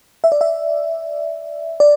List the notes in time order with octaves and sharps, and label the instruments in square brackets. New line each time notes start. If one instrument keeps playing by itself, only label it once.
[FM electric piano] E5
D5
E5
D5